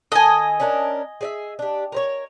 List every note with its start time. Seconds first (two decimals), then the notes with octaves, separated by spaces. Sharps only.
0.12 D#3 A4 D#5 G#5
0.60 C#4 D4 A#4
1.21 G#4 D5 E5
1.59 D4 G4
1.92 A#4 C5 C#5